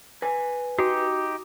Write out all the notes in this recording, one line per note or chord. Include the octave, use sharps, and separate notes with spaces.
B4 G#5
D#4 F#4 G4